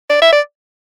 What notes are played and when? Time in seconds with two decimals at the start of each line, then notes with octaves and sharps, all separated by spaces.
0.10 D5
0.22 E5
0.32 D5